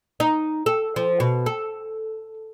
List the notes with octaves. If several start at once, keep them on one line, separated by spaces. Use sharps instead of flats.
D#4
A4
F3
B2
A4